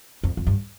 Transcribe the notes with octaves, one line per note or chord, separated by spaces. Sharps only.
F2
F2
G2